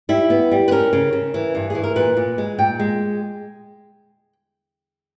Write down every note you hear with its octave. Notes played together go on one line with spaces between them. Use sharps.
G3 E4
B3
G3
B4
C#4 A#4
C#3
C#3
E3
G2
E3 G#4
A#4
A#2 B4
A#2
G#3
A#2 G5
G#3